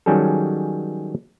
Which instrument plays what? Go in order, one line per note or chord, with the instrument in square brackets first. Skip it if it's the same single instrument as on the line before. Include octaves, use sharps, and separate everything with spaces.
[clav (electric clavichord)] D#3 F#3 G3 C#4 G#4 A4